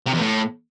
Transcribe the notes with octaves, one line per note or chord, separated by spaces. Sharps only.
C3
E2
A2